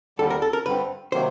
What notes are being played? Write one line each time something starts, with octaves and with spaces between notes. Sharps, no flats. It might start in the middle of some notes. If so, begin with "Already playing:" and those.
D#2 D3 G3 A4
A#4
A4
A#4
G2 D3 G3 C4 B4
C3 D#3 F#3 A#3 C5